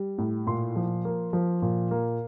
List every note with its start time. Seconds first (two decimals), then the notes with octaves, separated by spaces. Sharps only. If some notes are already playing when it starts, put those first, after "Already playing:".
Already playing: G3
0.18 A2
0.47 A#2 C6
0.76 F3
1.05 A#3
1.33 F3
1.62 A#2
1.91 A#3